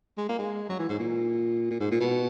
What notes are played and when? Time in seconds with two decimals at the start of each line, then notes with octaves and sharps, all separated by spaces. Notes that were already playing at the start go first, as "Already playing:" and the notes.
0.18 G#3
0.29 A#3
0.39 G#3
0.69 F#3
0.79 E3
0.89 G#2
0.99 A#2
1.71 A#2
1.80 G#2
1.91 A#2
2.00 B2